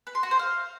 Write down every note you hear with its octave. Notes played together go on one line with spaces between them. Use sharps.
B4
C6
F#4
C5
F5